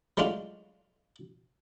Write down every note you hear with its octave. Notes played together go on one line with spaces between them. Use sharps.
F#3 G#3 A3 D4 F4 F#4